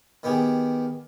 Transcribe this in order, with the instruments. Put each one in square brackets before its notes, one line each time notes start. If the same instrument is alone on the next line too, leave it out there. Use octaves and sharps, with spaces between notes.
[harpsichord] D#3 B3 G4 G#4